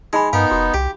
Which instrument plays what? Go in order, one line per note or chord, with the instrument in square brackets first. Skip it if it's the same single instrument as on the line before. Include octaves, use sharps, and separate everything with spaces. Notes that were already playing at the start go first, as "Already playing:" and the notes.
[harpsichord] G#3 [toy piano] D#4 G#5 B5
[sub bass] G2 [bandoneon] B3 D#4 [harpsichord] A#4 [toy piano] F5
[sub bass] F1 [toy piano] F#4
[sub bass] C2 [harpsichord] G4